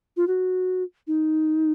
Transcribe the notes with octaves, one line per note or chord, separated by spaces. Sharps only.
F4
F#4
D#4